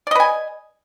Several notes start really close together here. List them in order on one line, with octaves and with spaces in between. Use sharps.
D5 D#5 B4 G#5